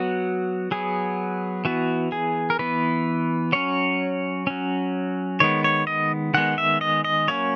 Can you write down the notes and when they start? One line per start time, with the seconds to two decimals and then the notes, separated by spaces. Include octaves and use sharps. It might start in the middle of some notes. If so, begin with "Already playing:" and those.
Already playing: F#3 B3 F#4
0.71 F#3 B3 G#4
1.65 E3 B3 F#4
2.12 G#4
2.50 A#4
2.59 E3 B3 B4
3.53 F#3 C#4 C#5
4.47 F#3 C#4
5.40 D#3 G#3 B3 C#5
5.64 C#5
5.87 D#5
6.34 D#3 G#3 B3 F#5
6.58 E5
6.81 D#5
7.05 D#5
7.28 F#3 A#3 C#4 C#5